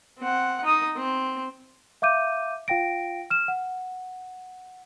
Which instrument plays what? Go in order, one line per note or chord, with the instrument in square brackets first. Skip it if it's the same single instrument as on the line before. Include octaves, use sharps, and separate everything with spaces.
[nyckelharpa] C4 F#5
D#4 D#6
C4
[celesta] E5 F5 D6 G6 D#7
F4 F5 G5 A#6 D7
F6 E7
F#5